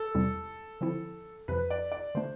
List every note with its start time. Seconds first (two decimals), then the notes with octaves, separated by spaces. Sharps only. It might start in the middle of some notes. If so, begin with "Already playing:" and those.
Already playing: A4
0.15 E2 C3 G3 C4 E4
0.81 D3 F3 C4 E4
1.48 F2 C3 F3 B4
1.70 D5
1.92 D5
2.15 D3 A3 D4 C5